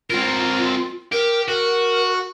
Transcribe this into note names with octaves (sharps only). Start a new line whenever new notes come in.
C4 F4 A#4
G4 A#4
F#4 A#4